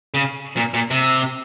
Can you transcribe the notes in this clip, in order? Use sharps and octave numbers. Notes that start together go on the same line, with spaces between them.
C#3
A#2
A#2
C3